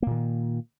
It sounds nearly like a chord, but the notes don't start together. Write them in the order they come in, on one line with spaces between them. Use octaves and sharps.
A#3 A#2 D#3